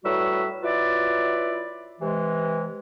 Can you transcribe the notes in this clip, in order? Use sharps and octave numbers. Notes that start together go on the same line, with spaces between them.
A2 F#3 G3 F#4 B4 E6
F#3 E4 F4 B4 D5
C3 E3 G#3